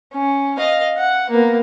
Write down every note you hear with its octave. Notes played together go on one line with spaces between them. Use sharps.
C#4
D#5 F5
F#5
A#3 B3